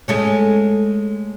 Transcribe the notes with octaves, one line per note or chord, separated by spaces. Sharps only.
G#3 A3 C#4